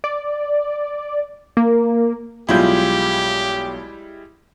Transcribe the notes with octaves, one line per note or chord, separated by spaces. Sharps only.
D5
A#3
B1 G3 G#3 E4 F4 G4 G6